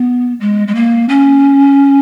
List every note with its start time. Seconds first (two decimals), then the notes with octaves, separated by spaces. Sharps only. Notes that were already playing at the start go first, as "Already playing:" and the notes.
Already playing: B3
0.40 G#3
0.67 G#3
0.74 A#3
1.09 C#4